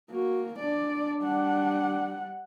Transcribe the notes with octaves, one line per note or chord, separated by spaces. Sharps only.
A#3 F#4
D4 D5
G3 F#5